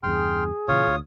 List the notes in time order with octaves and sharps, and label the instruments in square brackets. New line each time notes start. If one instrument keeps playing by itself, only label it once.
[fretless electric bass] E2 G2 C#3 [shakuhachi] G#4 [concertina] G5 C6 F6
[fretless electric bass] A#2 C#3 E3 [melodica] F4 C#5 [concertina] D#6
[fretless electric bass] D2